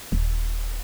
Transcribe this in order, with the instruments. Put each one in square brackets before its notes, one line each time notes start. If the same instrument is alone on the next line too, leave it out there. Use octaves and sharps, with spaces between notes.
[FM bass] D#1